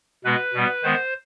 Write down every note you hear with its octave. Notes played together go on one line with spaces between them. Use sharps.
B2 G#3 B3 B4
B2 G3 B3
D#3 G#3 B3 C5